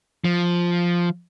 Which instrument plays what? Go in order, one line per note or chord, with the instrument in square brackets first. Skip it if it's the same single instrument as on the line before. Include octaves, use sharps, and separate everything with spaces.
[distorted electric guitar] F3